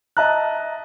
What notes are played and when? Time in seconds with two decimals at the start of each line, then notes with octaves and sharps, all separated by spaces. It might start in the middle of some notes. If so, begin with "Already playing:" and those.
0.17 D#5 E5 A5 A#5 F#6